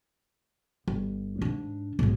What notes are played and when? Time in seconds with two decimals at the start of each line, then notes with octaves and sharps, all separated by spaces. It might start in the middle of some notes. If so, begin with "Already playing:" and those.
0.88 G1
1.42 G#2 D4
1.99 B1 G#2